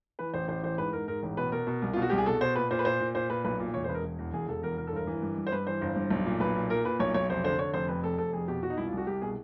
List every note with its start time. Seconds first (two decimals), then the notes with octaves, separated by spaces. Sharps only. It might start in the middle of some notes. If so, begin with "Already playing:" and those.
0.19 E3 B4
0.34 A1 C5
0.48 A1 C5
0.63 E3 C5
0.78 G#2 B4
0.93 G#2 A#4
1.08 G#2 A#4
1.23 A1
1.37 B2 B4
1.52 B2 A#4
1.67 B2
1.82 C2
1.93 B2 F4
2.02 F#4
2.10 C2 G4
2.18 G#4
2.26 B2 A4
2.41 B2 C5
2.56 A#2 B4
2.71 A#2 C5
2.79 B4
2.85 A#2 C5
3.00 A#2
3.15 A#2 C5
3.30 A#2 B4
3.45 B1 B4
3.59 A#2
3.74 E1 C#5
3.84 C5
3.89 E1 B4
3.94 A#4
4.03 E1
4.19 E2
4.33 E1 G#4
4.48 E1 A4
4.63 E2 A#4
4.78 E1 A#4
4.87 A4
4.92 G1 A#4
5.07 E3
5.22 G2
5.37 G2
5.47 C5
5.52 G2 B4
5.66 E3 C5
5.81 G1
5.96 G2
6.10 B1
6.26 A#2
6.40 B1 B4
6.55 A#2
6.70 A#2 A#4
6.85 A#2 B4
7.00 B1 C#5
7.14 B1 C#5
7.29 F1 C5
7.44 D3 C5
7.59 D3 C#5
7.74 F1 C5
7.88 F2 B4
8.03 F1 A4
8.18 F1 A4
8.33 F2 G#4
8.48 B2 G4
8.63 B2 F#4
8.70 D#4
8.77 C2 E4
8.87 F4
8.92 C2 F#4
9.07 C2 G4
9.22 B2 G#4